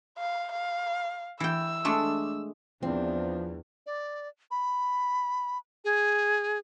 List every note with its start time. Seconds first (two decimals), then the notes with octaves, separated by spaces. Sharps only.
0.18 F5
0.52 F5
1.40 E3 G5 E6
1.85 G#3 A3 D4
2.83 E2 F3 C4 D4
3.86 D5
4.51 B5
5.85 G#4